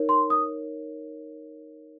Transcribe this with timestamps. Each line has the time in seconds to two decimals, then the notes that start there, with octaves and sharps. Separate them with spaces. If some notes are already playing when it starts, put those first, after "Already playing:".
Already playing: D#4 A#4 C#5
0.09 C6
0.30 D#6